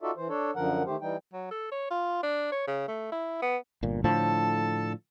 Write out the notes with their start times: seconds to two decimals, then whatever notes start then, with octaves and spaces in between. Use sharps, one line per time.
0.02 D#4 F4 F#4 A4 D5 E5
0.17 E3 C5
0.29 D4 A4 C#5
0.56 F#2 D3 F3 A#4 F#5
0.86 D#3 A3 G4 C5
1.01 E3 G3 D#4 G5
1.33 F#3
1.51 A4
1.72 C#5
1.91 F4
2.23 D4
2.52 C#5
2.67 C#3
2.88 A3
3.12 E4
3.42 B3
3.83 G1 A#2
4.04 A2 D3 F3 A4 A5